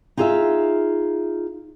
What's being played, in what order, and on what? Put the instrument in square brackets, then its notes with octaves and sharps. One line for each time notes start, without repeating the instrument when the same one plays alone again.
[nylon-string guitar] D#4 F4 G#4 B4 E5 F5